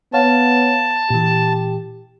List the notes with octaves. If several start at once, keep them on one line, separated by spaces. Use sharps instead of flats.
B3 C#5 F5 F#5 A5
A#2 E3 G4